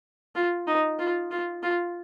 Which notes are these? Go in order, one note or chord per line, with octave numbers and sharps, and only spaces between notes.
F4
D#4
F4
F4
F4